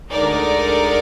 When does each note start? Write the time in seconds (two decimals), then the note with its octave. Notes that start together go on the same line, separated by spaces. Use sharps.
0.11 D2 D3 G#3 D#4 A#4 D5